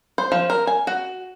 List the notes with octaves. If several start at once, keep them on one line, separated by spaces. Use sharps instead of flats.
C5
F3
A#4
G#5
F#4